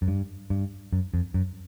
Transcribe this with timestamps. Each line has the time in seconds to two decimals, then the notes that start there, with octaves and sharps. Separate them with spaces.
0.02 F#2
0.08 G2
0.50 G2
0.93 F#2
1.14 F2
1.34 F#2